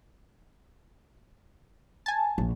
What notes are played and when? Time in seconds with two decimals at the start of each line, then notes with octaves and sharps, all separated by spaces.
2.06 G#5 A5
2.38 A#1